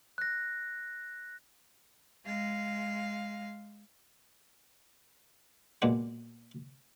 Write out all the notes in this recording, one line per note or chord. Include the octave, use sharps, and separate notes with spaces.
F#6 A#6
G#3 F5
B1 A#2 G#3 B3 D4 B4